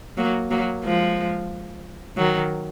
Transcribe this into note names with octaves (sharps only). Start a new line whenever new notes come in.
F#3 A#3
F#3 A#3
F3 G#3
D#3 F#3